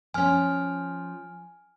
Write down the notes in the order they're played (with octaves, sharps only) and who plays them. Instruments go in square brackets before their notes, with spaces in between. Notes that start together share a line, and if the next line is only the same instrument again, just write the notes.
[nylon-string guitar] F3 C#4 [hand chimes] G#5 F6